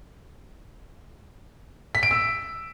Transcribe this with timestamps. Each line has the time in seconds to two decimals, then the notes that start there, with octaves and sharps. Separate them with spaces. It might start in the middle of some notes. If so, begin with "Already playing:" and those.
1.95 B6
2.03 D7
2.11 E6